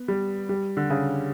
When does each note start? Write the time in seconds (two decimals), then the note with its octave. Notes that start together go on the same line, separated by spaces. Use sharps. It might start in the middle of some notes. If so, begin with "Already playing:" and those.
Already playing: B3
0.08 G3
0.49 G3
0.77 D3
0.90 C#3